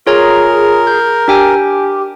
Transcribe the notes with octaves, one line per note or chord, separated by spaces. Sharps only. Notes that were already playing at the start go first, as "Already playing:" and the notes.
F4 G#4 A#4 C#5 A#5
G6
D4 G4 G5 G#5